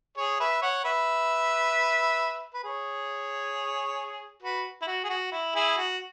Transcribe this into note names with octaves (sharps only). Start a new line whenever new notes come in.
G#4 C#5
B4 E5
C#5 F#5
B4 E5
B4
G#4 C#5
F#4 B4
E4
F#4
G#4
F#4
E4
E4 G#4
F#4